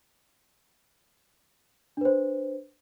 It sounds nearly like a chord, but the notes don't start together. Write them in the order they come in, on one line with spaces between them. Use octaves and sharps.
D4 B4 C5